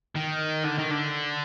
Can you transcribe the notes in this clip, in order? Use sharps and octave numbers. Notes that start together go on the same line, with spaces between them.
D#3
D3
D#3
D3